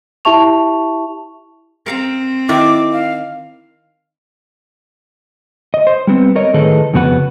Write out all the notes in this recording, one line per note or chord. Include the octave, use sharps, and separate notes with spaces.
E4 G4 E5 A5 C#6 F7
C4 A#4 F5 A#5
D#3 E4 E5 D6
F5
D#5
C5
G3 B3 C4
A#4 C#5 D#5
A2 D#3 G#4 A4 B4 D#5
F2 C#3 B3 F#4 B4 F#5